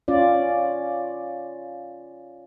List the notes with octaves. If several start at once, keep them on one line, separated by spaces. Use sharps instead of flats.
C#4 F4 D5